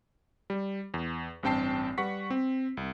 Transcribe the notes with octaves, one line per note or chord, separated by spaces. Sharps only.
G3
E2
A1 G2 C4 G5 A5 C7
G3 B4 F#5 C#6 B6
C4
C2